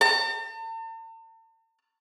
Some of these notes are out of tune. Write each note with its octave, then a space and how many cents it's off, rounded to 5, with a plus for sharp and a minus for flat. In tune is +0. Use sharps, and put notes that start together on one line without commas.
A5 +45